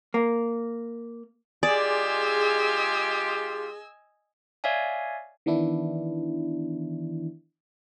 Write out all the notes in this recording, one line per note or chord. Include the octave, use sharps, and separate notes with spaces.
A#3
G#3 F4 G4 G#4 D5 D#5 G#5 E6
C#5 D5 E5 F5 G#5
D#3 E3 B3 D4 E4